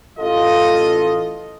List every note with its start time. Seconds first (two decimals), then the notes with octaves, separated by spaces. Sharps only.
0.20 A1 F4 A4 D#5